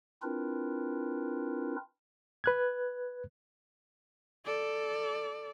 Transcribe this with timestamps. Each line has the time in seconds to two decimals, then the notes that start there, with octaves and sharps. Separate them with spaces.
0.22 C4 D4 E4 F4 A#4 B4
2.44 B4 F#6 G#6
4.45 A4 D5